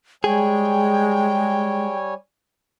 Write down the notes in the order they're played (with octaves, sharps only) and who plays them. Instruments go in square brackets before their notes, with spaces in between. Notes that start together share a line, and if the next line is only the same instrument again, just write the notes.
[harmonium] G3 C#5 G#5 [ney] G#3 [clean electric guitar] G#4 [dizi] G5